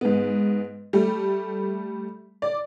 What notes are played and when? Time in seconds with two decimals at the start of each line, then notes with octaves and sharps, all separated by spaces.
0.01 G#2 B3
0.93 G3 A3
2.42 D5